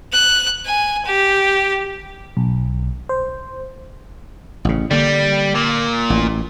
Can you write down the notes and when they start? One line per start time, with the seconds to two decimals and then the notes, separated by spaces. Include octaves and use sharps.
0.13 F#6
0.66 G#5
1.05 G4
2.37 B1
3.09 C5
4.65 A1 C#3
4.91 D3 G3 A#3
5.55 A#2
6.10 A1